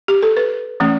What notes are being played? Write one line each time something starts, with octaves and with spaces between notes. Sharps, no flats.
G4
A4
B4
E3 A3 C#4